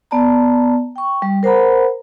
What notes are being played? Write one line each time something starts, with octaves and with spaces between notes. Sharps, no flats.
B3 D5 A5 A#5
G5 C#6
G3
A#4 C5 F#5 A#5 B5